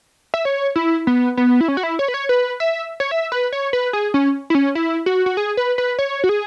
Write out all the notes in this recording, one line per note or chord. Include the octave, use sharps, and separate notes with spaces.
E5
C#5
E4
B3
B3
E4
C#4
F#4
E4
C#5
B4
C#5
B4
E5
C#5
E5
B4
C#5
B4
G#4
C#4
E4
C#4
E4
F#4
F#4
G#4
B4
B4
C#5
F#4
G#4